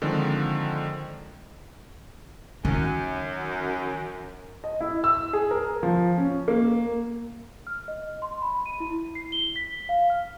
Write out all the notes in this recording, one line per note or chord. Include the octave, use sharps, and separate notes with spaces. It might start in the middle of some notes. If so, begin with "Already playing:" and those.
D3 D#3 F3 G#3 C4
F#2 D#3
D#5
E4
E6
G#4
A#4
F3
C#4
A#3
F6
D#5
C6
B5
D#7
E4
C7
G7
B6
F5
F6